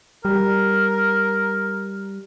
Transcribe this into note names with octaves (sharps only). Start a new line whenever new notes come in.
G3 A#4